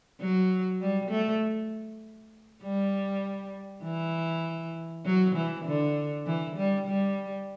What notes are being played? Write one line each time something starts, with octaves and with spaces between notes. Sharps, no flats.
F#3
G3
A3
G3
E3
F#3
E3
D3
E3
G3
G3